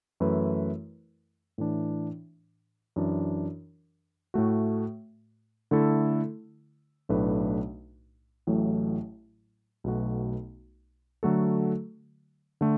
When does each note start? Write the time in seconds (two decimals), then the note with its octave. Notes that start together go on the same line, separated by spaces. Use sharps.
0.20 F#2 E3 A3 E4 B4
1.58 A2 E3 D4
2.96 F#2 E3 D4
4.34 A2 A3 F#4
5.71 D3 A3 E4 A4
7.09 B1 A2 A3 D4 B4
8.47 A1 A2 F#3 A3
9.84 B1 B2 A3 F#4
11.23 D3 F#3 A3 F#4 A4
12.61 D3 A3